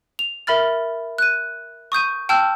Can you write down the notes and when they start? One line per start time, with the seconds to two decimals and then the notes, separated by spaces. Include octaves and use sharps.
0.19 F7
0.47 A#4 E5 B5 F6 A6
1.18 F#6 D#7
1.92 C#6 D#6 G6 D#7
2.29 G5 A5 E6 F6 G6